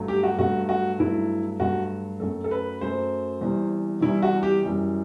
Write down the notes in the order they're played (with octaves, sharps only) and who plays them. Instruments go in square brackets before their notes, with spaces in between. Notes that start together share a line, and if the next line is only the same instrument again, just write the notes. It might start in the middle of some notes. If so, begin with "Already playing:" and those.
Already playing: [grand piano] G2 F#3 A3
G4
F#4
G2 F#3 A3 F#4
F#4
G2 F#3 A3 E4
G2 F#3 A3 F#4
F#2 F#3 A3 A4
A4
B4
F#2 F#3 A3 C5
E2 C3 E3 G3
E2 C3 E3 G3 E4
F#4
G4
F#2 E3 G3